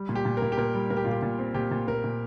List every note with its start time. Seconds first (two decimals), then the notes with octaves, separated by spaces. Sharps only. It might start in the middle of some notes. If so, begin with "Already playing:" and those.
Already playing: G3
0.09 A#2
0.15 G4
0.25 A#2
0.37 A#4
0.42 A#2
0.52 G4
0.58 A#2 A#4
0.75 G3
0.90 A#2 A#4
0.97 G4
1.04 A#2 F4
1.12 G4
1.22 A#2
1.39 C4
1.54 A#2 G4
1.71 A#2
1.88 A#2 A#4
2.04 A#2